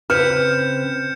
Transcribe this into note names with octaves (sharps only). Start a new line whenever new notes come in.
C#3 C4 B4 F6 G6 C#7 E7